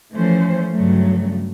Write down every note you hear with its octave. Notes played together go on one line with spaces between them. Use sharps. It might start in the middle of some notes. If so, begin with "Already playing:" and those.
E3 F3 A3 C#4 C5
G2 C#3 F#3 A3